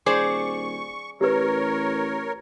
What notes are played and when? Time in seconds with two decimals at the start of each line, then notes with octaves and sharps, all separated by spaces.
0.06 D#1 G#4 C5 D5 C#6
1.21 A1 G4 A#4 B4 C#5